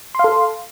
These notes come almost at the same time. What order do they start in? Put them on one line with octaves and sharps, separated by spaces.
C6 F5 A4